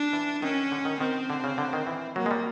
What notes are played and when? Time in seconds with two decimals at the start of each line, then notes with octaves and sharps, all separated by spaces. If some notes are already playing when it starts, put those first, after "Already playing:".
Already playing: D4
0.13 E3
0.42 D#3 C#4
0.71 D3
0.85 D#3
1.00 D#3 C4
1.30 D3
1.44 C#3
1.58 D3
1.73 D#3
1.87 E3
2.16 F#3 A#3
2.26 G#3
2.31 G3